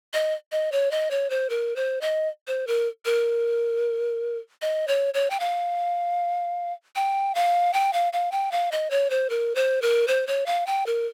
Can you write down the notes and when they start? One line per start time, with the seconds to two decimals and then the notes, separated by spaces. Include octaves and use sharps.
0.13 D#5
0.52 D#5
0.72 C#5
0.91 D#5
1.11 C#5
1.30 C5
1.50 A#4
1.76 C5
2.01 D#5
2.47 C5
2.67 A#4
3.05 A#4
4.62 D#5
4.88 C#5
5.14 C#5
5.30 G5
5.40 F5
6.96 G5
7.35 F5
7.74 G5
7.93 F5
8.13 F5
8.32 G5
8.52 F5
8.72 D#5
8.91 C#5
9.10 C5
9.30 A#4
9.55 C5
9.82 A#4
10.08 C5
10.27 C#5
10.46 F5
10.67 G5
10.86 A#4